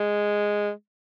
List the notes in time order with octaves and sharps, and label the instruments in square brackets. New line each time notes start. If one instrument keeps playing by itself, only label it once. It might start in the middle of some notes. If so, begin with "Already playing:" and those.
Already playing: [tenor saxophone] G#3